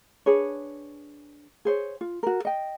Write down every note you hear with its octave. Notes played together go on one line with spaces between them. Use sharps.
D4 G#4 B4 C#5
G#4 C5 C#5
F4
F#4 A#4
D#5 G5